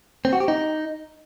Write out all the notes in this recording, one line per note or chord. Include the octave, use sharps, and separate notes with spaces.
C4
F#4
G4
D#4